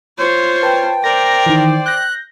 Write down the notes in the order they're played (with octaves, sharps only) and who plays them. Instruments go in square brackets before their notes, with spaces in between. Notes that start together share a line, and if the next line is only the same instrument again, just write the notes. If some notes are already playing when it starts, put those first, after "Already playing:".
[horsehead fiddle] F4 C5 [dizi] C#5
[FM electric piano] B4 A5 [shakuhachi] G5
[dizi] A#4 [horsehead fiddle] C5 D5 [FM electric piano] A#6
[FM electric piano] D#3 E3
[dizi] F#6 [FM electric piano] G6 A#6